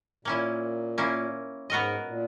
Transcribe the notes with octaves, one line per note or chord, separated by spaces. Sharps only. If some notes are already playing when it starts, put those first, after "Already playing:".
A#2 A#3 C#4 E4
A#3 C#4 E4
G#2 B3 F#4 A#4 D#5
A#2